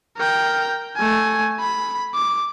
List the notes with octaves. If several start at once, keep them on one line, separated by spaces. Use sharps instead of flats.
A#4 G5
A3 G#5
B5
D6